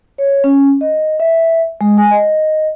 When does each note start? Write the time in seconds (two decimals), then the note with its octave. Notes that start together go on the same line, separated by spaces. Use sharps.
0.18 C#5
0.44 C#4
0.81 D#5
1.20 E5
1.81 G#3
1.98 G#5
2.11 D#5